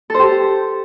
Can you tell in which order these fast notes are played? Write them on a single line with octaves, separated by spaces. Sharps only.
A4 C5 G4